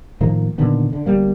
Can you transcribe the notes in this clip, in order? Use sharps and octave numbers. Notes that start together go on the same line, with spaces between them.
A2 D#3 F3 A#3
A#2 D3 D#3 B3
D3
G1 G3 A#3